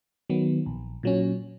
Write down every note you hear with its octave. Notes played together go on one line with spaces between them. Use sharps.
D#3 F#3 B3
A#1
A#2 F#3 C#4